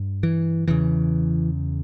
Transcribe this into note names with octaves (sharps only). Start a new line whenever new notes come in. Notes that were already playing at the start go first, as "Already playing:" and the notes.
Already playing: G2
E3
E2 C#3 E3